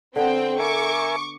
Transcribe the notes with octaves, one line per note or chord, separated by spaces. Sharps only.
D3 B3 C4 A4 G5
A#4 E5 G#5 C#6 D6